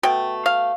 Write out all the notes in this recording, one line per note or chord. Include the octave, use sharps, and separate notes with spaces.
B2 A3 G5
F5